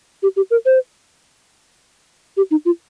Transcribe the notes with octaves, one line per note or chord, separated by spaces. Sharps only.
G4
G4
A#4
C5
G4
D#4
F4